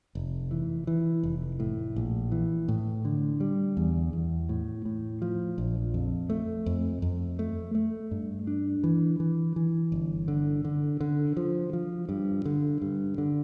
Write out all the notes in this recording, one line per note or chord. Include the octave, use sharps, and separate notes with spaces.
F1
E3
E3
F1
A2
A#1
E3
A2
D3
G3
E2
E2
A2
A2
F3
A#1
F2
A3
F2
F2
A3
A3
G2
D4
E3
E3
E3
G1
D3
D3
D3
F3
F3
G2
D3
G2
D3